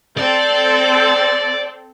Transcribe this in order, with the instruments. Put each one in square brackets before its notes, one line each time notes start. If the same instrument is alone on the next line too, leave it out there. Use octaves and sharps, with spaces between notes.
[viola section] C4 A4 [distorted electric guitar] D5